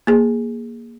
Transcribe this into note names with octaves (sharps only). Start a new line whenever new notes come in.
A#3 G#4